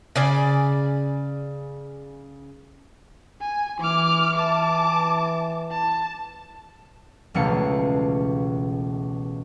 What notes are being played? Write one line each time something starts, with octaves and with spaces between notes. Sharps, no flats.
C#3 D5 G#5
G#5
E3 D6 F6
A5 D6
A5
E1 C#2 B2 A3 F5 C#7